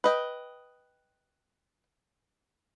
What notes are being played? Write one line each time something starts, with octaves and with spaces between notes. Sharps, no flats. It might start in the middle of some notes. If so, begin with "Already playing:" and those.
B4 D#5 G5